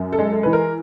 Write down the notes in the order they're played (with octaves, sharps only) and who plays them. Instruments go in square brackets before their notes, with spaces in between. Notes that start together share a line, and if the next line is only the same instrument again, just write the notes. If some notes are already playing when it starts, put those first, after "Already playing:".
Already playing: [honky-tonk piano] F#2
A4
G#3
A4
E3 B4
A#4